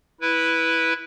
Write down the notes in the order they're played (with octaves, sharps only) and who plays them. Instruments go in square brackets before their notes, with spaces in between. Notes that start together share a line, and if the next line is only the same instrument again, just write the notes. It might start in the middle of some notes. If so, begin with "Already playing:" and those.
[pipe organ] E4 B4